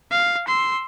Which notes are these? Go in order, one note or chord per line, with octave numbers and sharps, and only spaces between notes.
F5
C6 E6